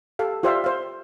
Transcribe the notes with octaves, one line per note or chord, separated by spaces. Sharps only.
G4 A4 F5
F4 G4 C5 D5 E5 F5
C5 F5